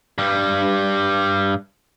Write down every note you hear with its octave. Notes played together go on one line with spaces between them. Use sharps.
G2 G3